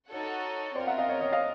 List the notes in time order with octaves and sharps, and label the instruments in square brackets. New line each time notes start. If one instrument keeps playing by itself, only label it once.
[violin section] D#4 F#4 A4 C#5 F#5
[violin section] C4 F4 A#4 [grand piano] C5 D5
[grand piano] E5 F#5
D#5 F5
C#5 D#5
C#5 D#5
D#5 F5